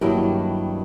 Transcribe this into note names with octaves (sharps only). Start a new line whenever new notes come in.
G2 D#3 F#3 A#3 E4